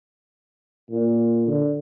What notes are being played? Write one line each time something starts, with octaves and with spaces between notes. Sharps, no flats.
A#2
D3